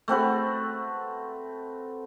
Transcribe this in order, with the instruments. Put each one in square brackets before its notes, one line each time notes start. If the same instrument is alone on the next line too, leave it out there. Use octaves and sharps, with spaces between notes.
[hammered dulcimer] A3 C4 F#4 B4